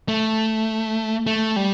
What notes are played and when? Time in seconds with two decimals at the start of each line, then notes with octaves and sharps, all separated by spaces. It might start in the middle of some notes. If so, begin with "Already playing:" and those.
0.08 A3
1.27 A3
1.56 G3